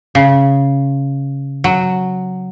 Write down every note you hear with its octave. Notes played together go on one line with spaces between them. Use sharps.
C#3
F#3